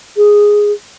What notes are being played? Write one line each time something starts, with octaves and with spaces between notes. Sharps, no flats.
G#4